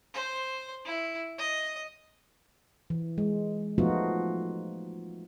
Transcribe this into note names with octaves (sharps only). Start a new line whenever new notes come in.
C5
E4
D#5
E3
G#3
F3 A3 B3 D#4 F4 F#4